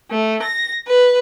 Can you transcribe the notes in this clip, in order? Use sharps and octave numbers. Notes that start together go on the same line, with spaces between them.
A3
A#6
B4